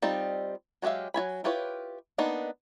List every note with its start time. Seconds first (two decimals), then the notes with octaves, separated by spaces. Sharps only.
0.02 G3 C4 D#4 F4
0.82 F#3 G#3 G4 E5 F5
1.14 F#3 F4 G#5 B5
1.44 E4 F4 G4 B4 C#5
2.18 A#3 B3 D4 D#4